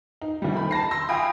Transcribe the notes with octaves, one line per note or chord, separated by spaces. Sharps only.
D#4
D2 G3
D#3 D#4 B5
A5 B5 A#6 C7
C6 E6 A#6
E5 F5 G5 G#5 B5 D#6